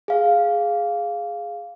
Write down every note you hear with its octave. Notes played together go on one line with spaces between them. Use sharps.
G#4 F5